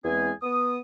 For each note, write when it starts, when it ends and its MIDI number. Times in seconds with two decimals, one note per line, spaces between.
0.05 0.31 40
0.05 0.31 52
0.05 0.31 56
0.05 0.31 60
0.05 0.31 68
0.05 0.31 80
0.42 0.78 59
0.42 0.78 87